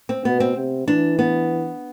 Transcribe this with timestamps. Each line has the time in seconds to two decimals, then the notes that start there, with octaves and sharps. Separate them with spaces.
0.09 C4
0.25 B2 B3
0.40 C4
0.56 C3
0.87 E3 D4
1.19 B3